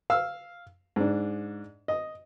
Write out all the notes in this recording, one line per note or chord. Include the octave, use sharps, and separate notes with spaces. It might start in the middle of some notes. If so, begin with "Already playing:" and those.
F5 E6
G#2 D4
D#5